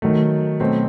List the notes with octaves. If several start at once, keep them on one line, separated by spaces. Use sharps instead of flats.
D#3 F#3 A3
B2 F#3 A3 C4